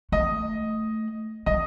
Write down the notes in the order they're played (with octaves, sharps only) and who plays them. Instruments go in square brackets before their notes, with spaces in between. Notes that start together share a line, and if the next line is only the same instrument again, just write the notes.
[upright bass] A3 [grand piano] D#5
[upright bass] G3 [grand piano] D#5